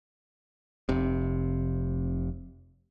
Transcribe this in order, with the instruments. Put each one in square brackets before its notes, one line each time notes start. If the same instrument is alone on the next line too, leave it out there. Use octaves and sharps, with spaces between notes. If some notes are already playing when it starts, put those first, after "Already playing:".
[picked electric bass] F1 C3